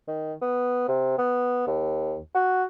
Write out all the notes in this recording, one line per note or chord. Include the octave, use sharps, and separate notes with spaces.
D#3
B3
C3
B3
D#2
F#4